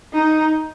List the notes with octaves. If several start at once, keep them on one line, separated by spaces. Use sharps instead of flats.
D#4